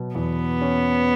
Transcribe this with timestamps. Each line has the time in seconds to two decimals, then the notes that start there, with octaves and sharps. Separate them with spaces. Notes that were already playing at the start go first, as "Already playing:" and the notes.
Already playing: B2 F#3
0.15 E2 B3
0.61 C#4